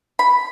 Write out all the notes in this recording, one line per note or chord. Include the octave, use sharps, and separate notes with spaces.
B5